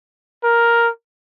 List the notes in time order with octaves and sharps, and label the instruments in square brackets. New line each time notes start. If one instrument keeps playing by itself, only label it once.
[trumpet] A#4